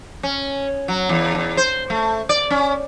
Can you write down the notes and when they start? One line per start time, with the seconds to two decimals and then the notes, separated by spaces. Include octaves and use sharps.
0.23 C#4
0.88 F#3
1.09 E2
1.35 E2
1.57 C5
1.90 A3
2.29 D5
2.51 C#4